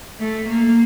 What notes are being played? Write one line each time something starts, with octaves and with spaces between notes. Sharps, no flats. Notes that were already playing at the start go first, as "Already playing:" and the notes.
A3
A#3